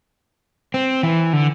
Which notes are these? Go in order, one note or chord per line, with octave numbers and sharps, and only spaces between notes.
C4
E3
D3